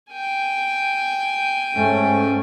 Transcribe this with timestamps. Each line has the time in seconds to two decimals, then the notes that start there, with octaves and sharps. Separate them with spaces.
0.11 G5 G#5
1.75 G#2 A3 C#4